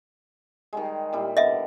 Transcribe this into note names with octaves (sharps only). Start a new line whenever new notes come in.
D#3 G3 G#3
A#2 G3 E4
D3 B3 D#5 E5 D6